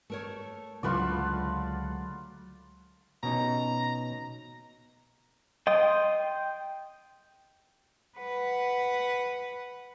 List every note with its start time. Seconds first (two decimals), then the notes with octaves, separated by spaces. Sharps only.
0.10 A3 A#4 C#5
0.83 C#2 D3 F#3 A3 F4 B4 D5
3.23 B2 C#4 D#4 A#5
5.67 D#5 G5 C6 D#6
8.18 B4 F#5